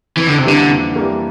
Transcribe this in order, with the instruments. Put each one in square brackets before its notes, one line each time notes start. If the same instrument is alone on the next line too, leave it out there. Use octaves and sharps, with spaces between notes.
[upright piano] F2 [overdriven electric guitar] E3
[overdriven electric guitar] D3
C3
[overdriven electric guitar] D3 [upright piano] E3 G3 A#3
[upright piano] F2
E3 G3 A#3